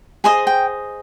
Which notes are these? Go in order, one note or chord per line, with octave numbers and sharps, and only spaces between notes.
G#4 C5 D#5 G#5 C6
G5